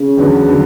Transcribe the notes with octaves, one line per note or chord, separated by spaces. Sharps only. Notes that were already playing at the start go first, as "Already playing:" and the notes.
Already playing: C#3
E2 D3 F#3 B3 F#4
D3 F#3 B3